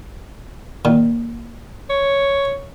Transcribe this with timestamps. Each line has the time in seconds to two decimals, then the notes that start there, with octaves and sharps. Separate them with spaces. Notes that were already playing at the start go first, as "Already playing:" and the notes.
0.85 A#2 D#3
1.90 C#5